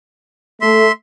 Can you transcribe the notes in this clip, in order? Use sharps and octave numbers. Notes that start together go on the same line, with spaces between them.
A3 E5 C6